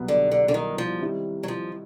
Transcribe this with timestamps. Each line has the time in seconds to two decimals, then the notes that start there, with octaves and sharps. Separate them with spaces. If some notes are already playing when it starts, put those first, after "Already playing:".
Already playing: C2 B2 F#3 B3
0.08 D3
0.31 D3
0.48 D3
0.54 D#3
0.78 F3
1.01 D#3 G3 C4 E4
1.43 F#3
1.48 F3